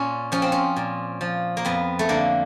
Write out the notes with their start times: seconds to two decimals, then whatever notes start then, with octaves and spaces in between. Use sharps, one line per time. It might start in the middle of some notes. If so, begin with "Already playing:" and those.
Already playing: A#2 C#4
0.32 F3 C#4
0.42 C4
0.52 C#4
0.76 A#2
1.21 F3
1.57 A#3
1.65 F2 B3
1.99 A3
2.09 D3 A#3